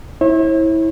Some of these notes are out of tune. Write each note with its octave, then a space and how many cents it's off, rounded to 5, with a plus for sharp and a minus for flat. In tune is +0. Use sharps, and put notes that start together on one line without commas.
E4 -20 C#5 -45